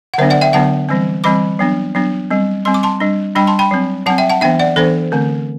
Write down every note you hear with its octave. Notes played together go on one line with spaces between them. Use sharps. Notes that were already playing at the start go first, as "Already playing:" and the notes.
F#5
D3 F#3 B3 D4 C5 E5
D5 F#5
E5 G5
D3 F#3 B3 D4 F#5 A5
E3 G3 C4
E3 G3 C4 B5 D6
F#3 B3 D4
F#3 B3 D4
G3 C4
G3 C4 C6
D6
A5 C6
G3 D4
G3 D4 G5 B5
A5 C6
G5 B5
F#3 C4
F#3 C4 F#5 A5
E5 G5
F#5 A5
E3 B3 D4 E5 G5
D5 F#5
E3 B3 D4 A4 C5
D3 A3 C4